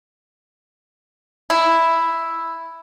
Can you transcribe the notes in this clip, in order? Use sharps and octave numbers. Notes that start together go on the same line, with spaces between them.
E4